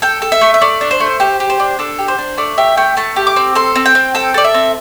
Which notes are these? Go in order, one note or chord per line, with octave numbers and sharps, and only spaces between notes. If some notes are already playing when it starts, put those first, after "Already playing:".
A4 G5
A4
E5
A3
E5
A3 D5
D4
C5
A3
G4 C5
G4
C5
D4
D4 A4
G4
C5
D4
A3 D5
G4 E5
A3 G5
A3 A5
G4
D6
C4
A4 C6
C4
G5
C4
A4 G5
A4 D5
E5
C4